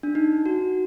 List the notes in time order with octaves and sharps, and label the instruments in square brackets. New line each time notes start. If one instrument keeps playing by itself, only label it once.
[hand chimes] D4
D#4
F#4